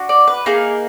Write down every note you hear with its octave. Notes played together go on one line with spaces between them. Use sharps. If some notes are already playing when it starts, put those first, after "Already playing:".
Already playing: D4 F#4
D5
B4
A#3 D#4 G#4 A#4